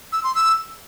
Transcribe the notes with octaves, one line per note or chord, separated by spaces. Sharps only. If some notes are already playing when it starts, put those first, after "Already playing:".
E6
C6
E6